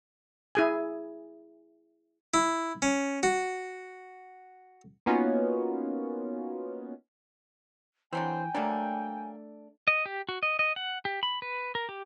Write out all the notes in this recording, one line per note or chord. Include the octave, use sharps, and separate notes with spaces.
E4 G#4 G#5
E4
C#4
F#4
A#3 B3 C#4 D#4 F4 F#4
D3 E3 F#3 C4 G5 G#5
F#3 G3 A3 A#3 D4
D#5
G4
F#4
D#5
D#5
F#5
G4
B5
B4
A#4
G4